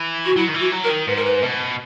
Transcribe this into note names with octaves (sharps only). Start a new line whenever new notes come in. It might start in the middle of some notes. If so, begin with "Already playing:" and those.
Already playing: E3
F#4
F#3 E4
D#3
E3
F#4
F#3
A#4
D#3
G#2 B4
A#4
B4
B2